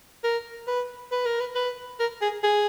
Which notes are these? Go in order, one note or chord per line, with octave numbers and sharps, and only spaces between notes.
A#4
B4
B4
A#4
B4
B4
A#4
G#4
G#4